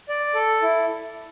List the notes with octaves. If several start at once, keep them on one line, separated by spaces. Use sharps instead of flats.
D5
A4
E4